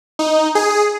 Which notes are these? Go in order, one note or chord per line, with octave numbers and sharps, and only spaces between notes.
D#4
G#4